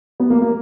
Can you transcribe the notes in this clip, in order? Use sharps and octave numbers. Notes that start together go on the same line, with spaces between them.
B3
A#3
A#3